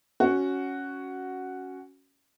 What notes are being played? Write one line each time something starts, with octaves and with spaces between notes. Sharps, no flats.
C#4 F#4